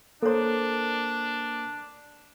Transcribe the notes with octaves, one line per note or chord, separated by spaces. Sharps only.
A#3 D4 A4 A#4 C5 C#5